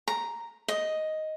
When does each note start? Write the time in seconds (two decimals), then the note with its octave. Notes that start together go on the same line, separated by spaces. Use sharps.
0.08 A#5
0.68 D#5